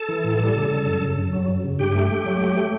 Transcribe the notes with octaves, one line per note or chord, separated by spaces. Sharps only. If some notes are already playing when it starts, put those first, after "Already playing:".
Already playing: A4 A5
E3
A2
G3
C#3
C#3
F#2
C#3
F#2
F#3
F#2
C#3
G2 G4 G5
A3
A3
F#3
A3
A3